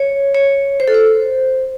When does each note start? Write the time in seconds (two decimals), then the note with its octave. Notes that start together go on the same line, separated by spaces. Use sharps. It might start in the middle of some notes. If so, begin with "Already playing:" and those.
Already playing: C#5
0.35 C#5
0.80 C5
0.88 A4
0.94 C5